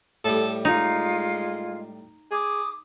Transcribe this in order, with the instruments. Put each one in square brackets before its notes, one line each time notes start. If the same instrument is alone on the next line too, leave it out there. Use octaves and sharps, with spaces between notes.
[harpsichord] A2 G3 [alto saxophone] A4
[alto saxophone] G#3 [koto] D#4 [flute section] F4
[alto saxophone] G#4 [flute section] D6 D#6